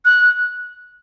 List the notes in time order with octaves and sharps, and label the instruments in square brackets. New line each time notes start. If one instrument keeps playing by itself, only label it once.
[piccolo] F#6